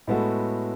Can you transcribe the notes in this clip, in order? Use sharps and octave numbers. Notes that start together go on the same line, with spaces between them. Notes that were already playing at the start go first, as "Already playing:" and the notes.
A2 G#3 B3 F#4 A4